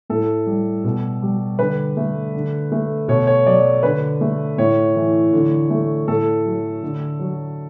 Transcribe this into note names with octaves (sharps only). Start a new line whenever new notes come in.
A2 A4
G3
B2
G3
D3 B4
A3
D3
A3
B2 C#5
C#5
F#3 D5
D3 B4
A3
A2 C#5
E3
D3
A3
A2 A4
F#3
D3
F#3